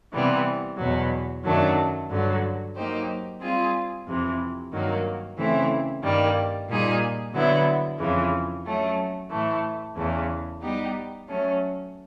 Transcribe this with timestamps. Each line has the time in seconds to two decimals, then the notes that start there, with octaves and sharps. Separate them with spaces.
0.13 C3 E3 G3 B3
0.78 E2 B2 F#3
1.44 F#2 D#3 F#3 A3 D4
2.10 G2 D3 F#3
2.75 F#3 A#3 D#4 G4 C5
3.41 G3 C4 F4 G#4
4.06 F2 C3 E3
4.72 G2 D#3 F#3 A#3
5.37 C#3 E3 A3 C4 E4
6.03 G2 D#3 G3 A#3
6.68 A#2 G3 A#3 D#4 G#4
7.34 D3 F#3 B3 E4
7.99 F2 C#3 E3
8.65 F#3 A3 C#4
9.31 A2 E3 A3
9.96 E2 C#3 E3 A3
10.61 G3 B3 D#4 G4
11.28 F#3 A3 C#4